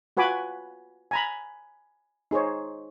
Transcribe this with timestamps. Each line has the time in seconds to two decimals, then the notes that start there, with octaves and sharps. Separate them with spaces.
0.17 F4 F#4 B4 G#5 B5 D6
1.11 G#5 A#5 B5
2.31 D#4 G#4 C5 C#5